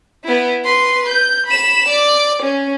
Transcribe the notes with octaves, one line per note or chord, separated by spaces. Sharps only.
B3 E4
B4 C6
G6
B5 E7
D5
C#4